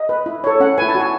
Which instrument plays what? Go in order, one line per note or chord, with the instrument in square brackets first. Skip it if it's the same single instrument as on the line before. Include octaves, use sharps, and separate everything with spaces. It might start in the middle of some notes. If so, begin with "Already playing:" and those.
Already playing: [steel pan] D#5
B4
E4
A4 C#5
C#4 F#5
E4 B4 G#5
A5
F#4
G#5